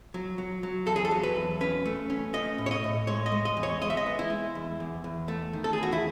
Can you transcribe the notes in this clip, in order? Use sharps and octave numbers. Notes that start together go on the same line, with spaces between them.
F#3
F#3
F#3
E2 A4
G#4
A4
F#3
B4
E2
C#4 B4
A3
C#4
A3 D#5
A2
C#5
D#5
A2
G#3 C#5
D#5
G#3
D#5
E2
C#5
G#3 D#5
E5
D#5
B3
E4
G#3
E2
E2
E2
A3
D#3
A4
G#4
E2
F#4
E4